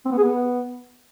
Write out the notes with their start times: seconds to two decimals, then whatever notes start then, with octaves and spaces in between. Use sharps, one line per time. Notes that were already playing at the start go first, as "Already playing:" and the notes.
0.05 C4
0.12 B3
0.18 G#4
0.24 B3